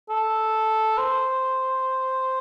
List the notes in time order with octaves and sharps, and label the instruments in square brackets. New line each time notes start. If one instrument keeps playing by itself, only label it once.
[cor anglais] A4
C5